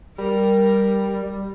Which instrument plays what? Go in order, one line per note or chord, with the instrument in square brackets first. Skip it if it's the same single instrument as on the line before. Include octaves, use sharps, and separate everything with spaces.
[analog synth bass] G3 [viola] A#4